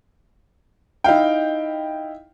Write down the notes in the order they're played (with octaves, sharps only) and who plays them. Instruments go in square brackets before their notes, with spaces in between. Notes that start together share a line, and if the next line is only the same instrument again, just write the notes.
[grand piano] D#4 E4 F5 G5